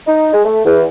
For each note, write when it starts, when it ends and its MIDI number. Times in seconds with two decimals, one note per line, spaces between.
0.07 0.29 63
0.33 0.41 56
0.45 0.60 57
0.65 0.83 40